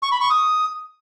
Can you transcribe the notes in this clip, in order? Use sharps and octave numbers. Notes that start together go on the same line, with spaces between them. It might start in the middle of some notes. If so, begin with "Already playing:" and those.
C#6
B5
C#6
D#6